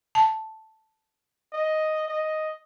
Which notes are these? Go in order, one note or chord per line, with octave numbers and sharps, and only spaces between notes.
A5
D#5
D#5